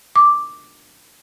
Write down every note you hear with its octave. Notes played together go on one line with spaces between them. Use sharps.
D6